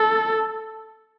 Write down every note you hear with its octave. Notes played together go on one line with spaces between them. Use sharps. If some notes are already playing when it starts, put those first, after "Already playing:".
Already playing: A4